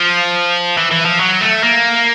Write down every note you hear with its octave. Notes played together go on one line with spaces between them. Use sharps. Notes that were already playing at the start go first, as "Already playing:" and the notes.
Already playing: F3
E3
E3
F3
F#3
A3
A#3